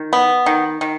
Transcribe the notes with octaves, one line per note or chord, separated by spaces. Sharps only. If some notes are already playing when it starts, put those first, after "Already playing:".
Already playing: D#3
B3
D#3
D#3